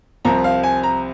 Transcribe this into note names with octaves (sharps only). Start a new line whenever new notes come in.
C2 C3 F3 C4 A#5
F5
G#5
A#5